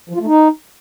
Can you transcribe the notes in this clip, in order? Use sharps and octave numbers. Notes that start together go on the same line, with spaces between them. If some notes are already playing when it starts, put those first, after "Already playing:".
F3
F4
A3
D#4